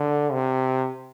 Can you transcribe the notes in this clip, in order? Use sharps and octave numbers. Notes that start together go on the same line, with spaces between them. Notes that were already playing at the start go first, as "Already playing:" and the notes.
Already playing: D3
C3